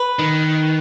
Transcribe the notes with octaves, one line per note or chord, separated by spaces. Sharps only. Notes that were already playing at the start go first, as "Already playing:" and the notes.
Already playing: B4
D#3